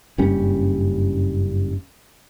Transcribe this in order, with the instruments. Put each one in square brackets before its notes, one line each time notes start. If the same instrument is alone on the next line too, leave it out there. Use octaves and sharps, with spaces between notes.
[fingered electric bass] F#1 G2 G3 C#4